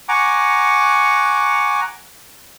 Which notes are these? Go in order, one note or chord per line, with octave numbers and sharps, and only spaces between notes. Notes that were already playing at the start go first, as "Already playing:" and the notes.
F#5 G#5 A#5 C#6 D6